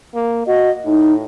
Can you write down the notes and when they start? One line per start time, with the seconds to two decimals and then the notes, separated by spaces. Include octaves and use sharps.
0.14 A#3
0.47 F#4 D#5
0.85 A2 D#4